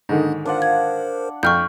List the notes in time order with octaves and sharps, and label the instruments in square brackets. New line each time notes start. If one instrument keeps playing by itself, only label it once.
[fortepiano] G#2 D3 D#3 [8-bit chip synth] D4
[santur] D4 F4 F#5 [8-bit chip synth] A#4 C5
[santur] F#5 [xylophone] G#6
[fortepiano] F2 G5 [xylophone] C#6 F6 G6